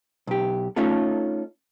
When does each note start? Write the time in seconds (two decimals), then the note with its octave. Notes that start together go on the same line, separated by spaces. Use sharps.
0.27 B1 G4
0.76 A3 C#4 D#4 F4 A4